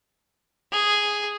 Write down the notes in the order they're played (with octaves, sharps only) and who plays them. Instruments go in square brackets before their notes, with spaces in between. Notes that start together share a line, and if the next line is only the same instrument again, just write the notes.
[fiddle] G#4